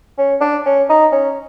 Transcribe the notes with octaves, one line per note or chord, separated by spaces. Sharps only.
C#4
D4
C#4
D#4
C#4